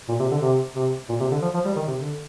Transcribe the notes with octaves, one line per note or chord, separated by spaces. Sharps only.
A#2
C3
D3
C3
C3
A#2
C3
D3
F3
F3
G3
D#3
C3
D3